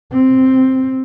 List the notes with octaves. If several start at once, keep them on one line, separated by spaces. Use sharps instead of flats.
C4